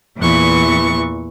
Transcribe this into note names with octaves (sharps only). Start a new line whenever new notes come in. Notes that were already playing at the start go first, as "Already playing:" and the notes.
E2 A#2 E3 C#6